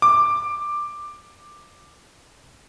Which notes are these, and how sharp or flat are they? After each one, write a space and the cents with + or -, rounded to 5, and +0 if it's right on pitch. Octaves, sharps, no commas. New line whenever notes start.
D6 +10